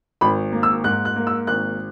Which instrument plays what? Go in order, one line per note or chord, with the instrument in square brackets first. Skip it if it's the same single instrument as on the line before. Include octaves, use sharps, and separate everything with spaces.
[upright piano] G#1 B5
A#3
E6
G#2 F#6
F#6
A#3
E6
G#1 F#6